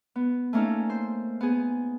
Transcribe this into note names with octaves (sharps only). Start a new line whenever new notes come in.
B3
A3 A#3 C#4 D#4 A4
C5
B3 G#4